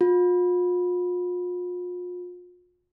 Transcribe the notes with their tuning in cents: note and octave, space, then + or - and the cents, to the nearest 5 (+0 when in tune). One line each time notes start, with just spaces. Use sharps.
F4 +40